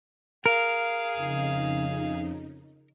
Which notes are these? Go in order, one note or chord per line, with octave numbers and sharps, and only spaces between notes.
G#4 A#4 F5
F2 C#3 D#4